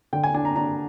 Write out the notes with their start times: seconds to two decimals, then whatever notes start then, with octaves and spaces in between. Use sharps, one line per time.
0.13 D3 G5
0.24 G#5
0.34 D4 G#5
0.45 A#5
0.56 D4 A#5